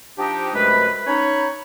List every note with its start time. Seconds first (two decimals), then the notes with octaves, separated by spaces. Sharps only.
0.18 F3 D4 D#4 G4
0.54 F#2 C3 G#3 A3 B4
1.07 C#4 D#4 C#5 B5